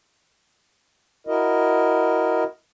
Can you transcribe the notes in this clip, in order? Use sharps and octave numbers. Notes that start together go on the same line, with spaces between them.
E4 F#4 A#4 D#5